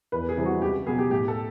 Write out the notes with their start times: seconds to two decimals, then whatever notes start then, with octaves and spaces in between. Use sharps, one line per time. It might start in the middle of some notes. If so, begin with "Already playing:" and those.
0.12 E2 B4
0.29 G#4
0.37 C3 E3 G3 C4
0.45 F#4
0.62 C#2 G4
0.86 B2 F#3 B3 G#4
0.98 G4
1.11 A2 G4
1.28 A4